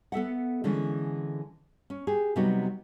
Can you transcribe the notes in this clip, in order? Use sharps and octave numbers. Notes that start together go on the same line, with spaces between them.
B3 A4 E5 F#5
D3 E3 G#3 C#4
C#4
G4 G#4
C3 F#3 G3 B3 D#4 F#4